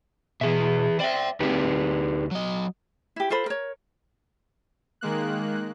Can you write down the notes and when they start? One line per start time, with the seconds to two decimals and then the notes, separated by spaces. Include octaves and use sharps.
0.41 B2 E3 G#4 E5
1.00 C5 D5 E5 G5
1.40 D2 C4 D#4 G4 B4
2.31 F#3 D#5
3.16 E4 G4
3.30 F4 A4 C5 B5
3.46 A#4 C#5
5.01 D#3 G#3 A#3 F#6